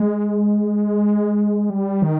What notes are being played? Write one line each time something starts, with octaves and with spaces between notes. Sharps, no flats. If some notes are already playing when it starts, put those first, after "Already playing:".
Already playing: G#3
G3
D#3